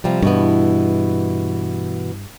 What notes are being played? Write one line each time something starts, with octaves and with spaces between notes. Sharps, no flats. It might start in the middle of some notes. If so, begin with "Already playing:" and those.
C3 F3 G3
G2 B2 E3 B3